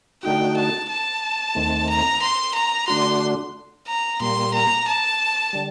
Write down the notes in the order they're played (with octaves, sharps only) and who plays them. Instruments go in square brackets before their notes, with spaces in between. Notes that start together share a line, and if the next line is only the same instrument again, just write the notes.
[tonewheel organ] D3 A3 D#4 F#4 [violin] G5
[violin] A5
A5
[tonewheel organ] D#2 D#3 A3 C4
[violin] A#5
C6
A#5
[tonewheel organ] D3 A3 D4 F#4 [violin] C6
[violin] A#5
[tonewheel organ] A#2 G3 A#3 [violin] C6
[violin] A#5
A5
[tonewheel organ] D3 G3